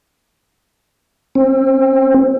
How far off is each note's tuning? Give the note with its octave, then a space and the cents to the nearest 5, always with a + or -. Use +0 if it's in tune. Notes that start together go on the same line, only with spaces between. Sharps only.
C4 +25